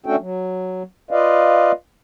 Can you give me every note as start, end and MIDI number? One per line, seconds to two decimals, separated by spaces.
0.06 0.16 57
0.06 0.16 61
0.06 0.16 62
0.06 0.16 66
0.06 0.16 69
0.06 0.16 79
0.20 0.83 54
1.11 1.72 65
1.11 1.72 71
1.11 1.72 74
1.11 1.72 75
1.11 1.72 77